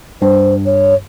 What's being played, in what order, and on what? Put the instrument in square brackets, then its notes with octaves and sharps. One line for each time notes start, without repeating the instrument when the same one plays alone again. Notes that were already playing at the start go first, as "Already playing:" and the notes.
[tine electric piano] G2 [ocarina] C5
[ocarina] C#5